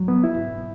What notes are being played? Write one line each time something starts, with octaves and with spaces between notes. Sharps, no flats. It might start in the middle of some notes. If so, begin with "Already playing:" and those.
Already playing: F#3
B3
E4